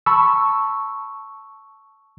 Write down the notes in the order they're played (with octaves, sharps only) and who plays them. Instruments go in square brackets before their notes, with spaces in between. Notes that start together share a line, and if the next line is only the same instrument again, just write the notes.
[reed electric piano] A5 B5 C#6 E6